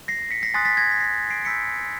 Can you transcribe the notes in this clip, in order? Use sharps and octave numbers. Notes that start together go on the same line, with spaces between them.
A#6 C7
B6 C#7
A#6 C7
G#5 C6 D#6 F#6 A6 B6
A6 B6
G#6 A#6
B6
A#6 C7
C7 D7
B5 E6 G6 B6 C#7